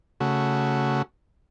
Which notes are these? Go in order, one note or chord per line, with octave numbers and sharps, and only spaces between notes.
C#3 A3 F#4